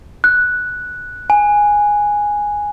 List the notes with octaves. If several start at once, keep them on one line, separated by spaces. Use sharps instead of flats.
F#6
G#5